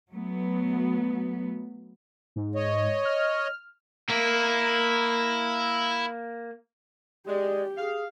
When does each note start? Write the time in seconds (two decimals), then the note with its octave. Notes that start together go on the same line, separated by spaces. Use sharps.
0.10 F#3 A3 B3
2.36 G#2
2.55 C#5 D#5
3.05 F6
4.10 A#3 E4
7.28 G#3 G4 D5
7.78 G#4 F5